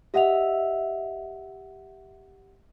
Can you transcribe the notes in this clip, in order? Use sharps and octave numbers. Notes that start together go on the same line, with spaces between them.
G4 D#5 E5 F#5 F7